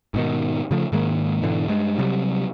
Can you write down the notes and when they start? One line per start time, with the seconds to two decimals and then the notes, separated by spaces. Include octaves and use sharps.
0.14 G#2 B2 D#3
0.71 C#3 F3 A3
0.92 G#2 D#3 G#3 A#3
1.42 G#2 B2 D3 E3
1.68 G2 G#3
1.99 C3 F#3 G3